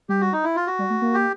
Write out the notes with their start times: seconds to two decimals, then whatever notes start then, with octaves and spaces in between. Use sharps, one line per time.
0.09 G3 G4
0.21 F#4
0.33 D#4
0.44 E4
0.56 F4
0.67 F#4
0.79 G3
0.90 A3
1.02 A#3
1.14 G4